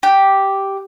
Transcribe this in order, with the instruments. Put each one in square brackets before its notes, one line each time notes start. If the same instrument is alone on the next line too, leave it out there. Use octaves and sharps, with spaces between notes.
[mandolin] G4